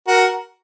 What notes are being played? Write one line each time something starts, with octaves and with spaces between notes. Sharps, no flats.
F#4 A#4